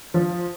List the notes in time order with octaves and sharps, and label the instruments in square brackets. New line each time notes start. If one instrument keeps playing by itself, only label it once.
[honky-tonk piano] F3